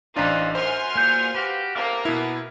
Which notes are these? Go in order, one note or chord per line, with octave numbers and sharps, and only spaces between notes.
A1 E3 F3 D4 D#4 F4
F#2 C5 G#5 C6 F6
E2 A#2 F#3 A#3 G6
F#4 G4 B4 F5
A2 C3 A#3 F5 D6
B2 B3 E4 A#4